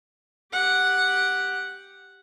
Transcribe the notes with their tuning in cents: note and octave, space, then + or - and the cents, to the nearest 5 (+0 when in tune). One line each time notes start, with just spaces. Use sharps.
G4 +0 F#5 +0